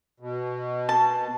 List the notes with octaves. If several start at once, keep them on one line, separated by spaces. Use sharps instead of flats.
B2
A5